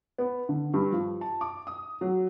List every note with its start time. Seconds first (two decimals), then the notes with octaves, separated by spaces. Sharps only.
0.18 B3
0.49 D3
0.74 G2
0.92 F3
1.21 A5
1.41 D6
1.67 D#6
2.01 F#3